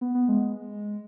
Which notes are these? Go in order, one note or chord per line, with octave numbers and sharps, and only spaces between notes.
B3
B3
G#3